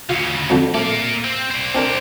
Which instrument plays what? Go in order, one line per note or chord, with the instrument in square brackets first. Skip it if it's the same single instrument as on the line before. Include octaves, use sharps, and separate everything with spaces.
[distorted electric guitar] D2 C#3 [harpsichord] F4
[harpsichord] F2 D3 F3
[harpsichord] A3 [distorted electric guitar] A#3 D5
[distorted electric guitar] C4
C5 D5
[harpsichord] C4 D4 A#4